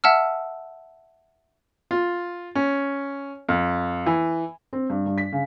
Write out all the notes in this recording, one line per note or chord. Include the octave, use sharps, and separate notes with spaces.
E5 F#5 A5 E6 F6
F4
C#4
F2
E3
C4
G2
G2
B6
C#3